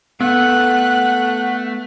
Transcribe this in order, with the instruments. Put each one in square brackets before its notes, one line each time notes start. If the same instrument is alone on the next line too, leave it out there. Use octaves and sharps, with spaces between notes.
[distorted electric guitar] A3 [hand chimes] B3 [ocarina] F#5 [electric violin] F#6